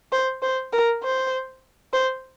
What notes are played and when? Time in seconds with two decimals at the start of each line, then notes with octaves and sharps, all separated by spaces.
0.12 C5
0.42 C5
0.73 A#4
1.03 C5
1.93 C5